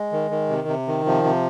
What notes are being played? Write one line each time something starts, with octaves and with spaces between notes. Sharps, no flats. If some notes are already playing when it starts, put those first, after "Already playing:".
Already playing: G#3
D#3
D#3
C3
C3
D#3
C3 F3
C3